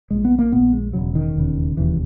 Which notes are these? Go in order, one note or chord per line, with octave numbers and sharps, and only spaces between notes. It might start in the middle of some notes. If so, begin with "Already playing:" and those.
A#1 A#2 G#3
B3
A#3
A#1 A#2 B3
G#3
E1 D#2 C#3 F#3
D#3
E1 D#2 C#3
E1 D#2 C#3 E3